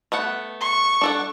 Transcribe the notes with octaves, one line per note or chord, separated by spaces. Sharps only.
A3 B3 F#5
C#6
D4 A4 F#5